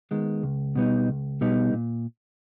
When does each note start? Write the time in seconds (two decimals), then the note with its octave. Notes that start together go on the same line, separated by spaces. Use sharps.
0.11 D#3 G#3 B3
0.43 C#2
0.75 B2 G3 B3 D#4
1.08 C#2
1.41 B2 G3 B3 D#4
1.73 A#2